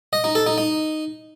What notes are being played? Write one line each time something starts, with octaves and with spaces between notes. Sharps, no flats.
D#5
D#4
A4
D#4
D#4